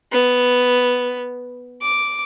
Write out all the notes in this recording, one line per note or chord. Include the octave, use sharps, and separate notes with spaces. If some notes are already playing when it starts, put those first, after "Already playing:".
B3
D6